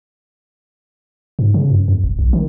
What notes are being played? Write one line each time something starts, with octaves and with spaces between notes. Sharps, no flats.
G#2
C#3
F#2
F2
E1
B1
D#3